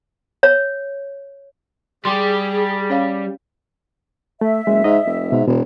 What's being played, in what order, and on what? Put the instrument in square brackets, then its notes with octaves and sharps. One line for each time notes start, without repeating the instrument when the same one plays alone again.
[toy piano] C#5
[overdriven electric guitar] G3 G4 [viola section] G#4 [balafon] C6
[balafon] C#4 C#5 F5
[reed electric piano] A3 [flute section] E5
[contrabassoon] F#1 [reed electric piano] G#3
[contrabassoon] G#2 [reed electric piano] D#5
[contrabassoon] F1
[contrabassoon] G#2 [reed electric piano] B2
[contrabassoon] E1 [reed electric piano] B2